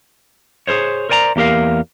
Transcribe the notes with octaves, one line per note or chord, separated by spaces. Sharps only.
G#4 A#4 C5 C#5
A#4 C5 D5 G#5 A#5
E2 A#3 G4 A#4 F5